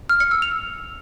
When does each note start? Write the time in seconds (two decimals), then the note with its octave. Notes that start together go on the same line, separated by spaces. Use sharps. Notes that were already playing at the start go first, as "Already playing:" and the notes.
0.09 F6
0.20 C#7
0.31 E6
0.42 F7